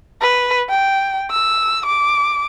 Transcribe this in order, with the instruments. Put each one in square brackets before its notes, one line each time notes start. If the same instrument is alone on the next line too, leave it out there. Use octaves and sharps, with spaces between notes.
[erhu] B4
G5
E6
D6